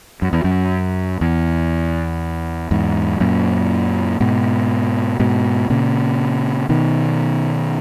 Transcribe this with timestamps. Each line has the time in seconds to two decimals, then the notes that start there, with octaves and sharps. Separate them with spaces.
0.22 F#2
0.33 E2
0.44 F#2
1.21 E2
2.71 E2 G#2
3.20 F#2 A#2
4.20 G#2 B2
5.20 G#2 B2
5.70 A#2 C#3
6.69 B2 D#3